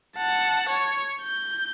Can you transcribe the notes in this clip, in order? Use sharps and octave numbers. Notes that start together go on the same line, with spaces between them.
F#5 A5
C#5
G6